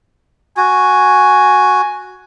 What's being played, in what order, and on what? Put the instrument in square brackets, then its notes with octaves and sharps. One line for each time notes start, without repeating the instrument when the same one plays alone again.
[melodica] F#4 [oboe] G#5